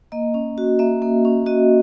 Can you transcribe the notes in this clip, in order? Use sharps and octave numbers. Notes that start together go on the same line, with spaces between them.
A#3 D#5
C#4
F#4
A#3 E5
A#3
C#4
F#4 D#5